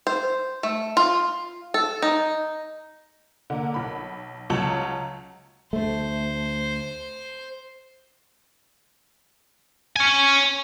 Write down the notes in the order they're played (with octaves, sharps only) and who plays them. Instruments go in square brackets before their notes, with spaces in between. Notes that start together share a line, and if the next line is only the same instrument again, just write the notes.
[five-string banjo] C5
A3
F4
A4
D#4
[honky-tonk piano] D3 A#3
B1 B5
C#2 F#3 C#5 A5 F#7
[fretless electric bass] D2 A3 [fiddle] C5
[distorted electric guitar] C#5 G#5